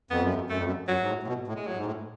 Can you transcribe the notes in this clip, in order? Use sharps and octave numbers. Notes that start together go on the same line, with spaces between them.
F2 B3
F#2
F2
F#2 A3
F2
F#2
F#2 F#3
G#2
A2
A2
B2
A2
G#3
A2 F#3
G#2
A2